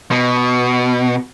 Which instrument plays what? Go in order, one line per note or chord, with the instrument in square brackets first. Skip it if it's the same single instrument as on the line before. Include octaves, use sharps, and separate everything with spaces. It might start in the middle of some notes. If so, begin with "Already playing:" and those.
[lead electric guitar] B2